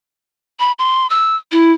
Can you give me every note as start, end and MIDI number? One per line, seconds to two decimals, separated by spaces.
0.60 0.72 83
0.79 1.09 84
1.10 1.36 88
1.52 1.72 64